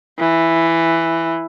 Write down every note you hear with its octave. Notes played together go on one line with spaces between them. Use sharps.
E3